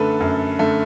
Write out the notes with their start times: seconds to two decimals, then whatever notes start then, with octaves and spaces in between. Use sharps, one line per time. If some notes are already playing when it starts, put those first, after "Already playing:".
Already playing: F#2 D3 A3 A4 B4
0.21 F#2
0.59 D3 A3